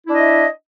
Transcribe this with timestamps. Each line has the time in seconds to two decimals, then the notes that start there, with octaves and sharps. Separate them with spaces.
0.05 E4
0.09 D4
0.13 D#5
0.18 E5